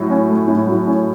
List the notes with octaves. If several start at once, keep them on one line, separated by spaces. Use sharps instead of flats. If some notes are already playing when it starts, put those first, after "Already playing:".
Already playing: A2 F#3
C#4
A3
A2
F#3
C#4